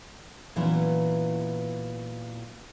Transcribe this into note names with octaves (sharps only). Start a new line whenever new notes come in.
A#2 E3 F#3 B3 C#4 E4